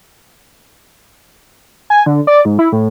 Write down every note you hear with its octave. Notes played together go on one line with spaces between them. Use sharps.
G#5
D3
D5
G#2
E4
A2